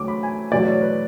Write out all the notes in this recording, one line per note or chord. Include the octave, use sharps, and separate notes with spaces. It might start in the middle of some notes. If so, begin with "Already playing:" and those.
Already playing: E2 D3 F#3 A3 D6
B5
G#5
E2 B2 F#3 A3 D5
C#5
B4